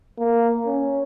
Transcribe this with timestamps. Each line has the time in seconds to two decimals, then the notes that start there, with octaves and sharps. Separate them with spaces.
0.19 A#3
0.67 C#4